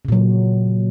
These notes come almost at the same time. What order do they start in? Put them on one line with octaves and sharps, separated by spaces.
C#3 A#2 F#3